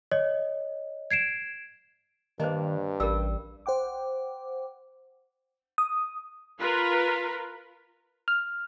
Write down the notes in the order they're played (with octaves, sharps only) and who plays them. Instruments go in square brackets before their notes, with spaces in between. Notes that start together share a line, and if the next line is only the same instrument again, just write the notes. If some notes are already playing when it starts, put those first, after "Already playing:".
[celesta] C#5 D#5
G#6 C7 D7 E7
[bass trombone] G2 [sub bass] D#3 [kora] A#3 D4 [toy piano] C5 D#5
[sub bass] A1 [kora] G3 [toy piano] A#4 E6
[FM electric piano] C5 F#5 G5 D6
D#6
[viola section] F4 A#4 B4
[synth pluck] F6